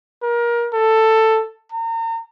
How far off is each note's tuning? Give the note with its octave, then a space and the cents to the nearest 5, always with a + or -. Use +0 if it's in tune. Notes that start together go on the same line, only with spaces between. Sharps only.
A#4 +25
A4 +10
A#5 -35